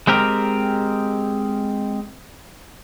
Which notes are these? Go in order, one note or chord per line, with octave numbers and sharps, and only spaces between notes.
G#3 C4 G4 A#4